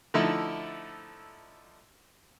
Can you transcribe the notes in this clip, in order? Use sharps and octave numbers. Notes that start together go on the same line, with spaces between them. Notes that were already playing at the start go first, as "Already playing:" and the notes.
D3 F3 A3 D#4 E4